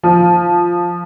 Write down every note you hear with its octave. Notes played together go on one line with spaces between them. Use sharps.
F3